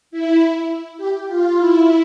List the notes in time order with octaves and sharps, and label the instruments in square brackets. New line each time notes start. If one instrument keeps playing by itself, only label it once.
[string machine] E4
G4
F4
E4